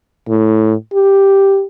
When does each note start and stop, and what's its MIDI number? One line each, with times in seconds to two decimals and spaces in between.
0.28 0.74 45
0.93 1.64 67